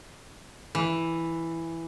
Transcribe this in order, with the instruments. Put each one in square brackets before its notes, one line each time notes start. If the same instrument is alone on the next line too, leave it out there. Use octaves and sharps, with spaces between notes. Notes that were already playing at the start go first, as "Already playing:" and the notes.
[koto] E3